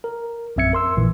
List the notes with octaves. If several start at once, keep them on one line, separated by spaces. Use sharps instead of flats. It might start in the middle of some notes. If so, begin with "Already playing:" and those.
A#4
A#1 F#2 C4 E5 G#6 C#7
A#4 C6 E6
A#1 A#2 E3